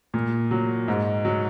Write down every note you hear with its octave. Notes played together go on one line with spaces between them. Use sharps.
A#2
F#3
G#2
F#3